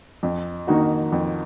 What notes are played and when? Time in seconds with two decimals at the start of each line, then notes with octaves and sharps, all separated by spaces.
0.23 F2
0.67 D#3 A#3 D#4 F#4
1.12 F2